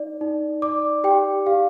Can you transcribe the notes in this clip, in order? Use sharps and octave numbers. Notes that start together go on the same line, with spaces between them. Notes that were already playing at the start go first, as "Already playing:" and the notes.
Already playing: D#4 D5
D#4
D5 D6
G4 G5
G4 F5